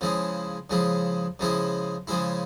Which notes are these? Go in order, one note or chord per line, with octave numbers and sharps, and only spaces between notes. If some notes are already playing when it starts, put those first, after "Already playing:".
C#3 F3 G#3 E4
C#3 F3 G#3 E4
C#3 F3 G#3 E4
C#3 F3 G#3 E4